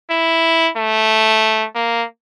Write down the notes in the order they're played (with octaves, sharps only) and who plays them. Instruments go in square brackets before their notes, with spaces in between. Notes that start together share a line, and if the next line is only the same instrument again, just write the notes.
[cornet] E4
A3
A#3